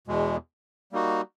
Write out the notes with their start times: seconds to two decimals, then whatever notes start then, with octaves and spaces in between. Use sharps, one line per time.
0.07 E2 B2 G#3
0.92 G3 A#3 D#4 F#4